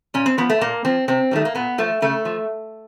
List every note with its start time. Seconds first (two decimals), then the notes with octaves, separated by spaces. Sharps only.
0.14 A#2 C#4
0.26 C4
0.38 F3 B3
0.50 A3
0.61 A#2 A#3
0.85 F3 C4
1.08 C3 C4
1.31 D#3 G3 A3
1.45 A#3
1.55 A#2 B3
1.78 F3 A3
2.02 C#3 A3
2.25 F3